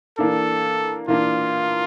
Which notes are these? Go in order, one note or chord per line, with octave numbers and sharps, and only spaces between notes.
E3 A#3 D4 A4
E3 A#3 D4 F4